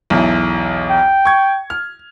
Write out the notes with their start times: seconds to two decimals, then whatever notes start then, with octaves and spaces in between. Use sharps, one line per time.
0.10 B1 E2 E4
0.90 G5
1.25 C#6 G#6
1.70 F6